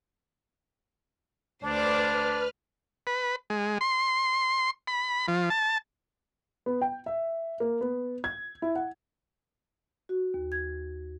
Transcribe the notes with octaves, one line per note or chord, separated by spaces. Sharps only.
D2 D4 B4 C5 D5 F6
B4
G#3
C6
B5
F3
A5
B3
G5
E5
A#3
B3
G#6
E4
F#5
F#4
D#2
G#6